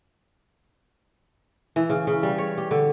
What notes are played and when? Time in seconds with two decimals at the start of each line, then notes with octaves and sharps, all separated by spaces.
1.76 E3
1.89 C#3
2.07 C#3
2.23 G3
2.38 C#5
2.58 G4
2.71 D3